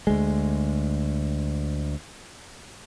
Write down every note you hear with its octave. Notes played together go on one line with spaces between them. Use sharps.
D2 G#3